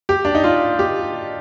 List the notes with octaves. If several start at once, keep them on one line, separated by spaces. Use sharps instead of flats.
G4
D4
D#4
F4
G4